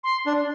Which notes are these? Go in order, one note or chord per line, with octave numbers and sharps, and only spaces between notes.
C6
D4